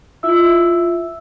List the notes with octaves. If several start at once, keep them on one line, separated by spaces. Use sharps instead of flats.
E4 F4 E5 E6